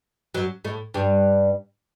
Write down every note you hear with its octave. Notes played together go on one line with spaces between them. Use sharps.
F#2 F#3
A2 A3
G2 G3